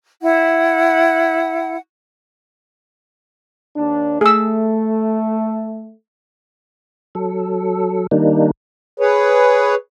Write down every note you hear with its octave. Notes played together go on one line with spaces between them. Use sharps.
E4 F#5
D#2 D4
A3 G#4 E6
F#3 A4
D#3 G3 A#3 D4 D#4
G#4 B4 C#5